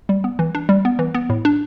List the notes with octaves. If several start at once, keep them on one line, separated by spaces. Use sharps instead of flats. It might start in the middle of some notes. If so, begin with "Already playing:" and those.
G3
B3
E3
D4
G3
B3
E3
B3
A2
D4